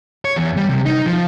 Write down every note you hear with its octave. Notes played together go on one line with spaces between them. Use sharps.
C#5
E2
G3
C3
D#4
F3